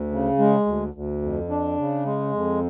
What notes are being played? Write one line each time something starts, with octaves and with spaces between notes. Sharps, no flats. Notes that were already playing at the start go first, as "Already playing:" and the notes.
Already playing: D2
C#3
G#3
D2
D2
F2
D4
C#3
G#3
F2